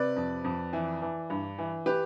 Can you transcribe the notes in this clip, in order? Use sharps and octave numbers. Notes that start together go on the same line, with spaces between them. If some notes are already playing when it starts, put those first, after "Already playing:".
Already playing: C3 B4 D5
F2
F2
E3
E3
G2
E3
G4 B4